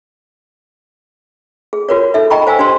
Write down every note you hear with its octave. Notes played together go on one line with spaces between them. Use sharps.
G#4
F4 F#4 A#4 B4 C#5
D#4 A4 E5
D#5 G5 A#5 B5 C#6
C5 F5 G#5 E6
D4 G4 C5 C6